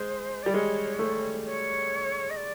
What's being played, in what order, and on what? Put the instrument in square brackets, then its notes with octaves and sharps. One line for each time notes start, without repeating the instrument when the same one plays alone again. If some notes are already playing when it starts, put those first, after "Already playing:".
Already playing: [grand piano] G#3 [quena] C5
[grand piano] G3 [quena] D5
[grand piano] G#3 [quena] C#5
[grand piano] A3
[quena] C#5
D#5
D5